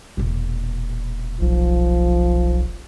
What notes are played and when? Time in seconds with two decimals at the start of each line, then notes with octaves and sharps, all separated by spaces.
0.17 E1 A#2
1.41 B1 F3